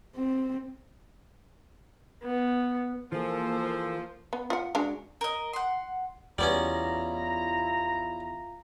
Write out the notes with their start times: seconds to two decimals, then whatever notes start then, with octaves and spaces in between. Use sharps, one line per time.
0.17 C4
2.25 B3
3.12 E3 F3 A#3 G#4 A4 C5
4.33 B3
4.50 F4 F#5
4.75 G#3 D4 F#4
5.21 A#4 D#5
5.53 F#5 C6
6.38 E2 G3 B3 C#4 E4 F4 A#5